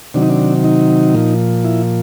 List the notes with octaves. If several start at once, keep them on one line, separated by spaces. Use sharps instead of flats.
C3 D#3 F#3 D4
D#4
D4
D#4
A#2 F3
E4